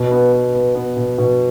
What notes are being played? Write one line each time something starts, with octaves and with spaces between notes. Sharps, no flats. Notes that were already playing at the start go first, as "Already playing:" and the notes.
Already playing: B2
B3
B3
B3
B3
B2
B2